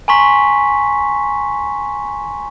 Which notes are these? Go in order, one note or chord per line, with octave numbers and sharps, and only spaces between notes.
G#5 A#5 C6 C#6 B6